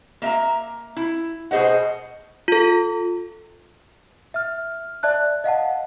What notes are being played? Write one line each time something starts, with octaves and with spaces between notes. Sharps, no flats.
A#3 E5 A#5
E4
B2 G#4 C5 D#5 F#5
F4 A4
E5 F6
D5 E5 A5 F#6
D#5 F5 F#5 A5